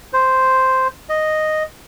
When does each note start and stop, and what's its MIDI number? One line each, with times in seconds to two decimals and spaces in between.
0.13 0.88 72
1.09 1.63 75